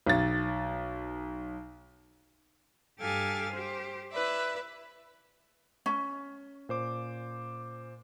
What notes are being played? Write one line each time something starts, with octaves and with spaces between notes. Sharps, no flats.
B1 A6
G2 G4 A4 F5 G#5 A6
G4 C5
E4 B4 D5 E5
C#4
A#2 C5 D6